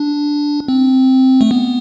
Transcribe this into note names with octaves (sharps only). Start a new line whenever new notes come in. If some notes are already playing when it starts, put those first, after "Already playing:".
Already playing: D4
C4
A3
B3